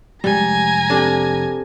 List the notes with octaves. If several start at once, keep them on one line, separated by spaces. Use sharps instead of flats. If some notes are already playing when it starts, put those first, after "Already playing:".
F1 E2 G3 G#3 G#5 A#5
C4 D4 G4 A4